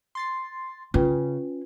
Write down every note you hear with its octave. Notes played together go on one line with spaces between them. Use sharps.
C6 A6 C7
C#3 C#4 F4 B4 G5